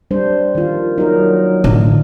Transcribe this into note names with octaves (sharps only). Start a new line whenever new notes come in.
G3 D4 C5
D#3 F4
F#3 D#4 A#4
A1 D3